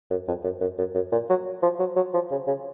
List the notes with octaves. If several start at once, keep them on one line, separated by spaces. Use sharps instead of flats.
F#2
F2
F#2
F#2
F#2
F#2
A#2
F#3
F3
F#3
F#3
F3
C#3
C#3